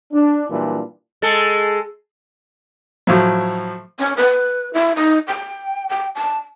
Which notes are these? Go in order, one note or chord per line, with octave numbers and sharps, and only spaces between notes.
D4
F#2 A#2 E3 G3 D4 F4
G#3 A4
A2 F3 F#3
C#4
B4
E4
D#4
G5
G5
A5